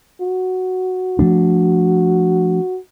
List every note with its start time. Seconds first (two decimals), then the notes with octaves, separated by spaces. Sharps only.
0.21 F#4
1.19 F3 A3 D4